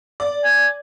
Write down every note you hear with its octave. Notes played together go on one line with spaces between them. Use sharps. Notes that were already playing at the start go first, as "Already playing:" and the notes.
D5
G#5